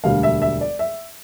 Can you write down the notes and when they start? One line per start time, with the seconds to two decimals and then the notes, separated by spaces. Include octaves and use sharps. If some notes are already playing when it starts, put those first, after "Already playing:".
0.04 E1 D2 D3 G3 F5
0.23 E5
0.42 E5
0.61 D5
0.79 E5